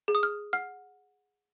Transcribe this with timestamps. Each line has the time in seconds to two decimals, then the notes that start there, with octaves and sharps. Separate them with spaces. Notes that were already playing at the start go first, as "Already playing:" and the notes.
0.08 G#4
0.15 D#6
0.23 F6
0.53 F#5 F6